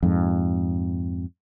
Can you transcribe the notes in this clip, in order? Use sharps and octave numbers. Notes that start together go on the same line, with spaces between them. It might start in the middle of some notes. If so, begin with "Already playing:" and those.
F2 G#2